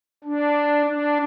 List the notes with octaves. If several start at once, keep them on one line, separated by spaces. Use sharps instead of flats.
D4
D4